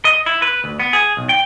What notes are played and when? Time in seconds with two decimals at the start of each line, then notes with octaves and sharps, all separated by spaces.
0.05 D#5
0.26 E4
0.42 B4
0.64 D2
0.80 B3
0.93 G#4
1.17 B1
1.29 G5